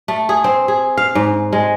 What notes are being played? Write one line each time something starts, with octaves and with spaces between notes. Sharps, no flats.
A3
G#4
C4
G#4
F5
G#2
G#3